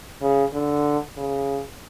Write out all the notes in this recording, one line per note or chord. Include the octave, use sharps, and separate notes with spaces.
C#3
D3
C#3